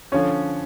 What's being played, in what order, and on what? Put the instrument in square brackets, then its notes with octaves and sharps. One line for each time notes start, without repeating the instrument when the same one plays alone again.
[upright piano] D3 F3 C#4 C#5